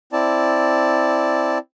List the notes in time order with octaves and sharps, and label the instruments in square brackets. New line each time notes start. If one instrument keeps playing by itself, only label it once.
[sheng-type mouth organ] C4 E4 D5 A5